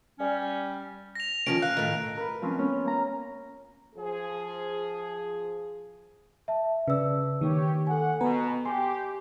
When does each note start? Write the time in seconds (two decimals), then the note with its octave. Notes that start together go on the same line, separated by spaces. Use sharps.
0.19 G3 C#4
1.15 A#6 F7
1.46 D#3 F3 C#4 D7
1.62 F5 F#6
1.77 A2 D#3
2.17 A#4 B4
2.42 F3 C4 C#4
2.59 B3 C#4 C#5
2.85 A#3 A#5
3.95 F3 G#4
6.48 E5 A5
6.88 C#3 B4 D5 E6
7.41 D#3 A#3 G4 C#5
7.87 A4 F#5 G#5
8.21 B2 B3 B4 G#5 A#5
8.66 G4 G#5 C6